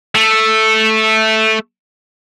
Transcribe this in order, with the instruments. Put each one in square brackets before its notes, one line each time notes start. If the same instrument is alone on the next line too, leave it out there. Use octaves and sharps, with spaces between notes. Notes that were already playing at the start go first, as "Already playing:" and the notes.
[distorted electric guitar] A3